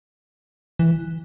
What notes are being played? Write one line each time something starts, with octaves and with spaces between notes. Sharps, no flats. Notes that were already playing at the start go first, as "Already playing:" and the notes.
E3